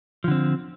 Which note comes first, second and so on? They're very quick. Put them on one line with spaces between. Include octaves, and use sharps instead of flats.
F3 D3 C4